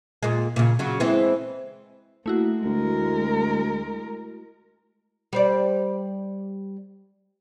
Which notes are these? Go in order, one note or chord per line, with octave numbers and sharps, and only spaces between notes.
A#2 G#3
A#2 C#3
C#3 F#3
E3 G#3 C4
A3 A#3 E4 F#4
D2 G#3 A#4
G3 C5 D5